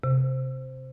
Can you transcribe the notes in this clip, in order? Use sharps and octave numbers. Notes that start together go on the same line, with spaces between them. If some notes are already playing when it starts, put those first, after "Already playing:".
C3